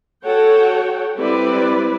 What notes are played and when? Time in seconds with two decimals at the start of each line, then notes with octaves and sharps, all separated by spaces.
0.25 F#4 A4 C#5 F#5 G5
1.17 G3 C4 E4 B4 D5